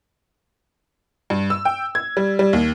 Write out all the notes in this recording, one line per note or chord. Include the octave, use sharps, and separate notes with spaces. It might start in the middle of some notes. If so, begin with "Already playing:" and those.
G2
E6
G5
G#6
G3
G3
D#2